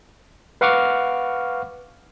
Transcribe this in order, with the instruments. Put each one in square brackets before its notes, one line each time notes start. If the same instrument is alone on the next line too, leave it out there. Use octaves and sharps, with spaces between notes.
[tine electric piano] B4 F5 F#5 C#6 D6 F6